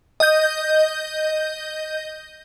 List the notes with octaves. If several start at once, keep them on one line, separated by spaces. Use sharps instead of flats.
D#5 G6